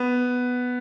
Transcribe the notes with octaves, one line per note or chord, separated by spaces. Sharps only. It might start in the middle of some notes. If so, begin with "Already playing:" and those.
Already playing: B3